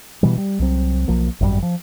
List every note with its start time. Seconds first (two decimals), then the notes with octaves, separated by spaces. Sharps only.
0.23 B2 E3 G3
0.38 G3
0.59 C2 F#3 C4
1.08 B1 F3 A#3
1.40 G#1 F#2 B2 G3
1.62 F3